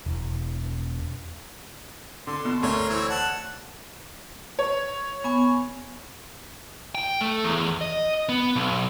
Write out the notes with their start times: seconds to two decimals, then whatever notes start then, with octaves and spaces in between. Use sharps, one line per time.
0.06 E1
2.27 D3 C6
2.45 B2
2.63 D2 A3 A#4 C#5 C6
2.89 E3 C4 C#5
3.09 F#5 A5
4.59 C#5
5.24 B3 G#5 C#6
6.95 G5
7.21 A3
7.44 E2
7.81 D#5
8.29 B3
8.56 B1